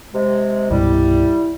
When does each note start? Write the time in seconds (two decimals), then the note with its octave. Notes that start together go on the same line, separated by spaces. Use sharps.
0.14 C3 G#3
0.71 C2 G2 B2 G3 E4